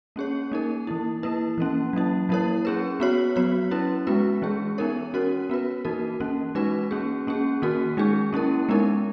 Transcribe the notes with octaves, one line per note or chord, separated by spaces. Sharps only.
A#3 C#4 G#4 C#5
A#3 D#4 A#4
E3 A#3 E4
A#3 E4 B4
E3 A#3 C#4
F#3 A#3 E4
F#3 A#3 E4 A#4 C#5
C#4 G#4 B4
B3 F#4 C#5
F#3 B3 F#4 C#5
C#4 E4 B4
G#3 B3 F#4 B4
E3 G#3 C#4 G#4
B3 D#4 A#4 C#5
C#4 F#4 A#4 C#5
B3 F#4 B4
E3 A#3 D#4 F#4 A#4
E3 A#3 C#4
G#3 D#4 F#4 B4
A#3 C#4 G#4
A#3 C#4 G#4
D#3 A#3 C#4 F#4 A#4
G#3 D#4 G#4
A#3 C#4 E4 A#4
G#3 B3 D#4 A#4